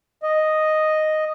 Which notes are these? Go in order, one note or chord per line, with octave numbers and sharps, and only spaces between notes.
D#5